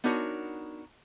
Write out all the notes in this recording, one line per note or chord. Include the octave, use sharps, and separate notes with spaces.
B3 D4 D#4 F#4 A#4 C#5